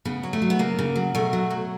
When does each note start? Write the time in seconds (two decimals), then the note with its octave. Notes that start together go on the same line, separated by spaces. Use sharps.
0.05 C#3 B3
0.23 F#3
0.33 A3
0.42 F#3
0.50 B3
0.59 C#3 A#3
0.79 C#3
0.96 F#3
1.15 B2 A3
1.33 F#3
1.50 F#3